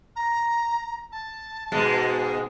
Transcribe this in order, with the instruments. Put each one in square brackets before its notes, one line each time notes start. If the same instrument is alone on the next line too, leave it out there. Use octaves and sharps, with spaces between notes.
[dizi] A#5
A5
[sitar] G#2 B2 G#3